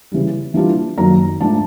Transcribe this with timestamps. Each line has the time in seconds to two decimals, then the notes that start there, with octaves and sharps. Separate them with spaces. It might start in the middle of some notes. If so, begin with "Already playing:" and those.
0.12 C#3 E3 G3
0.54 E3 G3 A#3 D4 F4
0.97 F#2 D#3 F#3 A#3 D#4 A#5
1.40 G#2 F3 A3 D4 A5